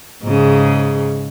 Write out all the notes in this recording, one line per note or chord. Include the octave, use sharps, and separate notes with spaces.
G#2 C#3